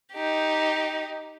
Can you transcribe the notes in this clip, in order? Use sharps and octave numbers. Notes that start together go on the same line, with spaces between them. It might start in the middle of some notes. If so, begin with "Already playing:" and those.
D#4 G4